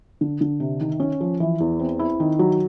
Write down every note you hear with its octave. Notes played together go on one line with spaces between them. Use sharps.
D3
D3
C3
D#3
C#4
F3
E3
E2
C4
E4
D#3
F#3